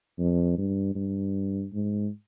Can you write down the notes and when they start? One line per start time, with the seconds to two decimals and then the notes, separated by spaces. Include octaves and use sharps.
0.19 F2
0.58 G2
0.95 G2
1.73 G#2